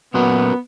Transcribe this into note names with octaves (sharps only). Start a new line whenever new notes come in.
A#2 F#3 B3 C#4 F#4 A#4